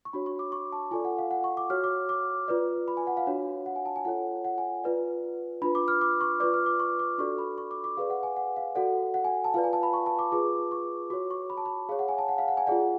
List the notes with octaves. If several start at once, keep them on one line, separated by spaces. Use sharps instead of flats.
C#6
D4 F#4 C#5 B5
C#6
D6
C#6
A5
F4 A4 D5 G#5
F#5
F5
F#5
C#6
D6
F#4 C#5 F6
D6
D6
F4 B4 D5
B5
G#5
F#5
F5
D4 F#4 C#5
F#5
G#5
A5
G#5
F4 A4 C#5 F#5
F#5
G#5
F4 B4 D5
D4 F4 B4 B5
D6
F6
D6
C#6
F4 B4 D5 D6
F6
D6
C#6
D6
D4 F#4 A4 D5 C#6
B5
C#6
D6
D6
G#4 B4 D5 F5
F#5
G#5
F#5
F5
F#4 A4 D5 F#5
F#5
G#5
A5
F4 B4 D5 F5
G#5
A5
B5
C#6
A5
D6
F4 G#4 B4 D6
C#6
F#4 C#5 D6
C#6
B5
A5
B5
G#4 C#5 F5
F#5
G#5
A5
F#5
F5
F#5
G#5
F4 G#4 D5 F#5